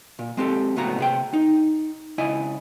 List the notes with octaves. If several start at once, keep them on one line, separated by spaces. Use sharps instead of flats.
A#2
G#3 C4 G4 A4
C#2 A2 A3 B3 F#4 A#5
C3 G#4 G5
D#4
C#2 E4 D#5 G#5